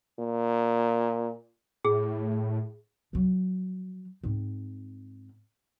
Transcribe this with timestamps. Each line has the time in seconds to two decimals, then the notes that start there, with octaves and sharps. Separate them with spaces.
0.19 A#2
1.84 A2 G#4
3.13 F3 F#3
4.23 G#2 C4